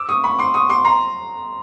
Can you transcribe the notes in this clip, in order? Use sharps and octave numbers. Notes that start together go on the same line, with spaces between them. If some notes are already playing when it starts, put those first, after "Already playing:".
Already playing: D6 E6
C#6 D#6
B5 C#6
C6 D6
C#6 D#6
C6 D6
A#5 C6